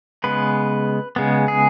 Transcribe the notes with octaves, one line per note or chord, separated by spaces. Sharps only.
C#3 G#3 B3 B4
C#3 G#3 B3
G#4